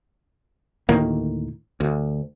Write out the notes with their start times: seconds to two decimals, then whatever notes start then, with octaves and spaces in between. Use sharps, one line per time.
0.89 D2 A2 D#3 A#3
1.80 D2